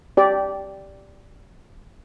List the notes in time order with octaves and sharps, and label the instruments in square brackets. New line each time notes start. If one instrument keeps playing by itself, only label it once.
[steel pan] G4 D5